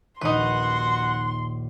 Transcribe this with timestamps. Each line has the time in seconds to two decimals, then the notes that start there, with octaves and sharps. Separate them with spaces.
0.21 A#1 D#2 C#4 D#4 F#4 B4 F#5 C6